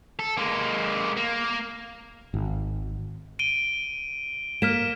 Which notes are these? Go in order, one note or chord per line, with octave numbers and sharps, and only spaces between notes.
A4
G#3 A#3
A#3
G#1
D7 D#7 G7
A#3 F6 B6 E7